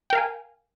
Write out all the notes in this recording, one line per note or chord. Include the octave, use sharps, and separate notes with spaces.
A#4 F5 G5 G#5